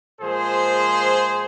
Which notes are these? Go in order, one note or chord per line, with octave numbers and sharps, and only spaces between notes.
A#2 F3 G#3 G#4 C5